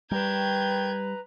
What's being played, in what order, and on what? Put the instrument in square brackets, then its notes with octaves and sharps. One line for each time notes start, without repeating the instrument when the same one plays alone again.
[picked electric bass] G3 [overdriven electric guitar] A#4 G5 [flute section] B4 A#5 [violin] G6 G#6